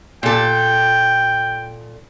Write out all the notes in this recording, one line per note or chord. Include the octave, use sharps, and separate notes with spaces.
A#2 A4 G5